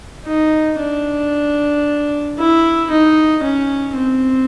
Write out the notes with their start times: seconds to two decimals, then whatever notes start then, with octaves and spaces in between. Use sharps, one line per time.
0.27 D#4
0.80 D4
2.39 E4
2.91 D#4
3.43 C#4
3.97 C4